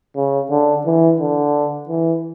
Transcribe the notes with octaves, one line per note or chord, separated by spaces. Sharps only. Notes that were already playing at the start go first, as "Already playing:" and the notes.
C#3
D3
E3
D3
E3